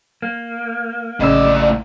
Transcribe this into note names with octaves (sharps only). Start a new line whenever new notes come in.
A#3
A1 A2 C#3 D5 D#5 E6